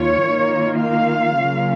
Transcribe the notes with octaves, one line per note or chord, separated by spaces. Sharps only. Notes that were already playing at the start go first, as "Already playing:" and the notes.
Already playing: D#2 F4 C#5
D#3 A#3 F4
F5
C#3 F#3 A#3 C#4 F4